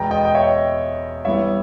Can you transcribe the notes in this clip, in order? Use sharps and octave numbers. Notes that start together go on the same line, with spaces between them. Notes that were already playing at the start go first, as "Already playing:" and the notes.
Already playing: E2 B2 G#3 B3 G5 A#5
D#5 G5
G5
C#5 E5
G2 E3 G3 B3 E4 C#5 E5